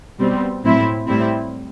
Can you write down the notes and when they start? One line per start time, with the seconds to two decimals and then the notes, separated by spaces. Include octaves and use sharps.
0.20 B2 G3 C4
0.64 A2 F#3 C4 E4
1.07 A2 G3 C4 E4